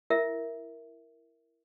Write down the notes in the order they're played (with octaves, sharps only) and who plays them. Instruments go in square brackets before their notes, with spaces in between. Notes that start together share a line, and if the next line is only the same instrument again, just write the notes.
[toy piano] E4 A#4 E5